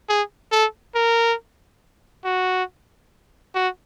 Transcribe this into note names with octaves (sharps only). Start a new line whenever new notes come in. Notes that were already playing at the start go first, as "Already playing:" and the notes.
G#4
A4
A#4
F#4
F#4